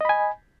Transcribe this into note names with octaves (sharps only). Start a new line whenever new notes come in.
D#5 G#5 B5